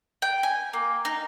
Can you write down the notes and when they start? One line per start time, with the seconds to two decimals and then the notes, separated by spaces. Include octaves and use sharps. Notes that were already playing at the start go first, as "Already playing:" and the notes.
0.22 G5
0.43 G#5
0.73 A#3
1.05 D#4